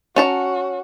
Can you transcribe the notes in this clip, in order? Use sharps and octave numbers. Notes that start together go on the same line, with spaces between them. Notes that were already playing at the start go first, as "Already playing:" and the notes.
C#4 F#4 A5 A#5